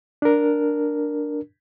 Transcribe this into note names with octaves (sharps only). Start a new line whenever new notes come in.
D4 A#4